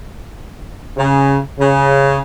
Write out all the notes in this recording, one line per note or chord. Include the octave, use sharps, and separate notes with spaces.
C#3
C#3